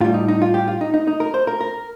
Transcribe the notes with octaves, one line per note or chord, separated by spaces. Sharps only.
A2 G3 F4
D#4
D#4
F4
G4
F4
D#4
D#4
D#4
A#4
C5
A#4
A#4